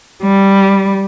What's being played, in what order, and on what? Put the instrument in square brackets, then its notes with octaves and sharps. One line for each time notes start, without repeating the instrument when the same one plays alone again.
[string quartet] G3